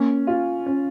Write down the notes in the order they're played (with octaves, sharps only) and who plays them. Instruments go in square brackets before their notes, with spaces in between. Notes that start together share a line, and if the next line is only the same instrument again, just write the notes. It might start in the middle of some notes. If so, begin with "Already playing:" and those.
Already playing: [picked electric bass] A#3 [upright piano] C#4
[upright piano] F4
C#4